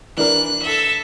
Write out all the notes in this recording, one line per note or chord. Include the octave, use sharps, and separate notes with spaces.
E3 D4 A#4 F#6
A4 E5